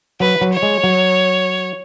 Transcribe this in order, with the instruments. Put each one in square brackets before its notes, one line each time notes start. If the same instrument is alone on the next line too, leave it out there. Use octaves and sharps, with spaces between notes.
[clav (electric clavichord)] F#3 [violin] B4
[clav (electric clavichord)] F#3
[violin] C#5
[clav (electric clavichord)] G#3
F#3